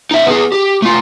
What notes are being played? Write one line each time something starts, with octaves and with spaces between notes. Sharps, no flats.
D#4 E5
B3 G#4
G4
A3 F4